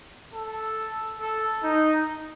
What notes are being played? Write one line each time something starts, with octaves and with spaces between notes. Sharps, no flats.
A4
A4
D#4